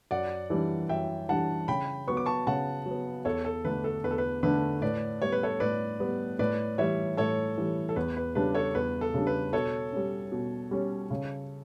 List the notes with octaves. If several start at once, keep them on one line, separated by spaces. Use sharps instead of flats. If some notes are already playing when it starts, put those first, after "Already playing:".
F#2 D5 F#5
E3 G3 D4
F#2 E5 G5
E3 G3 D4 F#5 A5
C#3 G5 B5
F#3 B3 C#6
D6
A5 C#6
C#3 F#5 A5
F#3 B3
E2 A4 C#5
A4
D3 A3 D4 B4
A4
E2 B4
A4
B4
D3 A3 D4 B4
A2 B4 D5
G3 B3 C#5
B4
A4 C#5
A2 B4 D5
G3 B3
A2 B4 D5
E3 G3 C#5 E5
A2 A4 C#5
E3 G3
A4
E2 B4
B4
C#3 G3 D4 B4
A4 C#5
E2 B4
A4
C#3 G3 D4
B4
B2 A4 C#5
G3 C#4
B2
G3 C#4
C#3